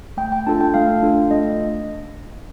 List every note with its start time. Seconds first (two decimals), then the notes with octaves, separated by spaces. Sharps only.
0.17 A3 G5
0.32 G5
0.47 D4 F4 A4 A5
0.61 G5
0.74 A3 F5
1.03 D4 F4 A4
1.31 A3 D#5